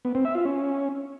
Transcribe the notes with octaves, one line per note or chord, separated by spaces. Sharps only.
B3
C4
E5
F4
C#4